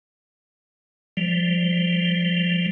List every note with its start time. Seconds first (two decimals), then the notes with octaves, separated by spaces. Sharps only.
1.17 F3 G3